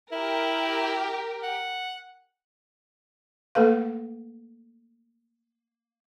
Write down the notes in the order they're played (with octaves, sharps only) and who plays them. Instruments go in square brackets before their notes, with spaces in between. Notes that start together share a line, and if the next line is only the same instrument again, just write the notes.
[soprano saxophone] E4 [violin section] G4 A#4
[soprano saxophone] F#5
[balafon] A3 A#3 A4 B4 F5